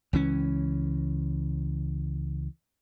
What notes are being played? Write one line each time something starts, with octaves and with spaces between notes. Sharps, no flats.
C#2 E3 C#4